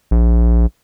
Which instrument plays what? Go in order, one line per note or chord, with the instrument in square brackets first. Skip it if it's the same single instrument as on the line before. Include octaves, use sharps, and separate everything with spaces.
[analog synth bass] A#1